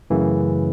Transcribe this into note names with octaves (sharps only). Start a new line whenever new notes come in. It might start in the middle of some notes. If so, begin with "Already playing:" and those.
F#2 C#3 E3 A3